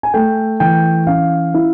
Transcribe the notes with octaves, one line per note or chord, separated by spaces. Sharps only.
G#5
A3 G5
E3 G5
C#4 F5
E4